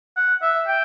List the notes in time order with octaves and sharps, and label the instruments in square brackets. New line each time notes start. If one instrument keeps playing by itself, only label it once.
[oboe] F#5
E5
G5